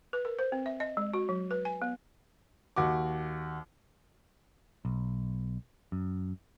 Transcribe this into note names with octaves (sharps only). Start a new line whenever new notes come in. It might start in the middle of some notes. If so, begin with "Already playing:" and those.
B4
A#4
C5
C4
E5
D#5
G#3
F#4
F#3
B4
G#5
B3
D#2 F#4 D6
B1
F#2